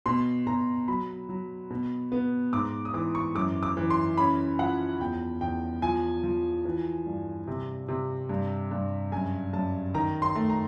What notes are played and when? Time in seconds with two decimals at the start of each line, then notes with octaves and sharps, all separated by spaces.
0.06 B2 C6
0.47 B2 A#5
0.88 F#3 B5
1.29 F#3
1.70 B2
2.12 B3
2.53 G#2 D6
2.85 D#6
2.94 E3 D6
3.15 C#6
3.35 F#2 D6
3.63 D6
3.77 E3
3.90 C6
4.17 C#4 B5
4.59 F3 F#5
5.00 E2 G5
5.41 E2 G5
5.82 F3 G#5
6.23 F3
6.65 E3
7.06 G2
7.48 C3
7.88 C3
8.29 G2
8.71 G2
9.12 F#2 G#5
9.53 F#2 A5
9.94 D#3 A#5
10.22 C6
10.35 A3
10.50 A#5